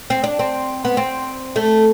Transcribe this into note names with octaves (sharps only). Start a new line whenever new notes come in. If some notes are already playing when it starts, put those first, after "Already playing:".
C4
D4
C4
B3
C4
A3